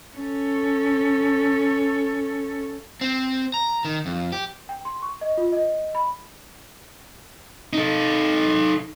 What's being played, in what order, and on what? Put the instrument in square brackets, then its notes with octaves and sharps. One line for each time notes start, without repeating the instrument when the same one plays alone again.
[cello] C#4 A4
[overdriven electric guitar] C4
A#5
D#3
F2
G4
[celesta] G5
C6
C#6
D#5
F4
D#5
B5
[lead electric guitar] D#4 A4